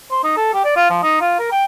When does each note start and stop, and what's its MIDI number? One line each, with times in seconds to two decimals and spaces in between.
0.11 0.20 72
0.24 0.32 63
0.37 0.52 69
0.54 0.62 67
0.65 0.75 74
0.76 0.90 65
0.90 0.98 53
1.03 1.16 63
1.20 1.35 65
1.39 1.51 70
1.52 1.65 79